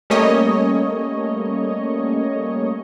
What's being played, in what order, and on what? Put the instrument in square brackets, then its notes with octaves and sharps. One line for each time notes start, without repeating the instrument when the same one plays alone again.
[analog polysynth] G3 A3 A#3 C#4 C#5 D#5